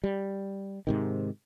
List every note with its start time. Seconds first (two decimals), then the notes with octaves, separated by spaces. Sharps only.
0.04 G3
0.87 G#2 C3 D#3